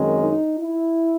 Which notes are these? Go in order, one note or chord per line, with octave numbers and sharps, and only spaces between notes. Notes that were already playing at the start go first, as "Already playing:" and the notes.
Already playing: F#2 D#3 G#3 C4
D#4
E4